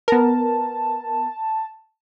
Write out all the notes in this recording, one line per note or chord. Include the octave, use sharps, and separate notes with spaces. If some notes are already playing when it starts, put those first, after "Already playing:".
B3 A#4 A5